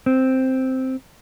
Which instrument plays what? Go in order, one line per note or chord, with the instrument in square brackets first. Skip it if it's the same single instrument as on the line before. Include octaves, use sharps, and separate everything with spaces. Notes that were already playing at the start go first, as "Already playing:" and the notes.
[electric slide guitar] C4